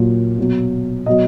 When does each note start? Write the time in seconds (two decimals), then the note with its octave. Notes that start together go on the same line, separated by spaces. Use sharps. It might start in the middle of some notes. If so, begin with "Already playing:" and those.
Already playing: A#2 F#3
0.38 B2 F#3
1.06 B2 F#3 D#5